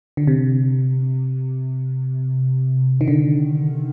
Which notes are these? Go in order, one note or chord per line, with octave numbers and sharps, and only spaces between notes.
D3
C3
D#3
D3